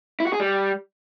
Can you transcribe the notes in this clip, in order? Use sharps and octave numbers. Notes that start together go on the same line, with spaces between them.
E4
F#4
G#4
G3